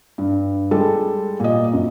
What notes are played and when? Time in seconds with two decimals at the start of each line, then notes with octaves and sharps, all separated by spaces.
0.18 G2
0.71 G3 G#3 A4
1.40 A#2 D#5
1.73 F#2